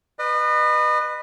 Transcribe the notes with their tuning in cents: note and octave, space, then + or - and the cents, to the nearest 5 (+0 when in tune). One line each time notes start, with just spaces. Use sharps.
B4 +0 D#5 -35